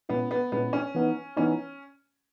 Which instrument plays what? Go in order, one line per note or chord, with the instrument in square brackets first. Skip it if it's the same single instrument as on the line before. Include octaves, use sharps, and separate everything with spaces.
[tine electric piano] A#2 G#3 C#4 E4 [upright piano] B3
[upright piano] B3
[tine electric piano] A#2 G#3 C#4 E4 [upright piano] B3
[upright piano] C#4
[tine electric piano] E3 B3 D#4
[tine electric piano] E3 B3 D#4 [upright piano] C#4